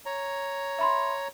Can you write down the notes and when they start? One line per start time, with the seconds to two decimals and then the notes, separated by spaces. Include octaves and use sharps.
0.06 C#5 A#5
0.79 E5 B5 C6